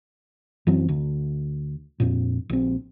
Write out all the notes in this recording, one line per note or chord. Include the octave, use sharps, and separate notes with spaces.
F#2 E3 F#3 C4
D2
F2 A#2
A#1 C4